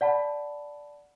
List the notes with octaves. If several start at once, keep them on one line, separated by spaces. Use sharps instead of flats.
D5 F#5 A5 B5